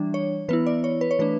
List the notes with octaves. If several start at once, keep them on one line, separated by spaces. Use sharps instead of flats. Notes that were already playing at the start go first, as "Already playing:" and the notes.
Already playing: E3 G3 D4
C#5
E3 B3 E4 B4
D5
C#5
B4
C#5
E3 A3 D4 B4